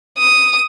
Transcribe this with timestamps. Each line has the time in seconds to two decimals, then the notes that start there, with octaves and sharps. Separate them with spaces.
0.18 D#6